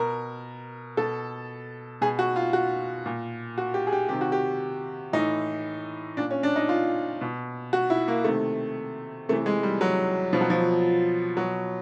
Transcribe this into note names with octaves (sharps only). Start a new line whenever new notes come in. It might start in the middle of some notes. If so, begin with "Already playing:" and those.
Already playing: B2 A#4
B2 A4
B2 G#4
F#4
F4
F#4
A#2
F#4
G4
G#4
G4
C3 D#3 G4
F#4
G4
A2 E3 D#4
A#2 D4
C#4
D4
D#4
F4
B2
F#4
E4
A#3
C3 D#3 A3
C3 E3 A3
G#3
G3
F#3
B2 F3
F#3
F3
B2 F#3